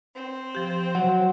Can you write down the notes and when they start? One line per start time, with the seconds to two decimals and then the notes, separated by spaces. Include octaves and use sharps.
0.14 C4
0.55 F3 G4
0.95 F#3 F#5